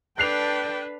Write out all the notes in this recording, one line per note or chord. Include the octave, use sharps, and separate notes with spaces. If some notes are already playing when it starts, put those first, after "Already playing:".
D4 A4 B4 D5 G5 F#6 C7 F7